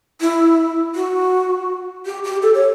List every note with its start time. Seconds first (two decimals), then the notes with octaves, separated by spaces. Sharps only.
0.21 E4
0.95 F#4
2.06 G4
2.24 G4
2.42 A4
2.54 C#5